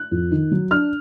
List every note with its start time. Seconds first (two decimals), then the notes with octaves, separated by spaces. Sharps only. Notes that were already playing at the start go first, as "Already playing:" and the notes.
Already playing: F#6
0.11 F2
0.31 D#3
0.51 F#3
0.71 D4 F6